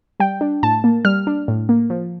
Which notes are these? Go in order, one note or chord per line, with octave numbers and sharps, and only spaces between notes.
G3 G5
D4
A2 A5
A#3
G3 F6
D4
A2
A#3
F3